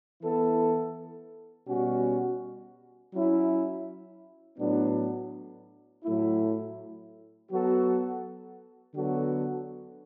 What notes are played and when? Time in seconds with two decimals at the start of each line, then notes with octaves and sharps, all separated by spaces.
0.22 E3 B3 E4 A4
1.68 B2 G3 C#4 F#4
3.14 F#3 C#4 E4
4.59 A2 F#3 B3 D4
6.04 A2 F#3 A3 E4
7.49 F#3 B3 F#4 A4
8.94 D3 F#3 B3 F#4 A4